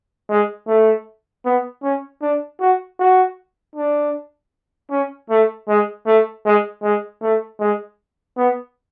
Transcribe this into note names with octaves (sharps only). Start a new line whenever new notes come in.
G#3
A3
B3
C#4
D4
F#4
F#4
D4
C#4
A3
G#3
A3
G#3
G#3
A3
G#3
B3